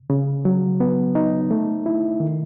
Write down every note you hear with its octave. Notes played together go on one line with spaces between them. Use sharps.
C#3
F#3
B3
D#4
A3
E4
D#3